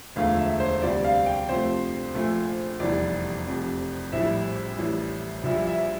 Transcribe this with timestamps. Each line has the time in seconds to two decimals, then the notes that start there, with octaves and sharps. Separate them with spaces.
0.16 E1 D2 D3 F3 A3 F5
0.39 E5
0.60 C5
0.82 D2 C3 G3 D5
1.04 F5
1.26 G5
1.48 F2 C3 F3 A3 C5
2.14 A#1 A#2 A3
2.80 F1 E2 E3 G3 D5
3.46 F1 F2 C3
4.12 A#1 A2 G3 E5
4.79 A1 A2 G3
5.44 A#1 A#2 G3 E5
5.67 E5